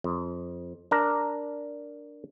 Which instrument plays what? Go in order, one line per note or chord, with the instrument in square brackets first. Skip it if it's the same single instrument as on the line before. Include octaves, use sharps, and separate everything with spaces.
[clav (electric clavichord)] F2
D4 A#4